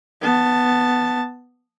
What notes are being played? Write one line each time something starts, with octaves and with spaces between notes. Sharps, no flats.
B3 A5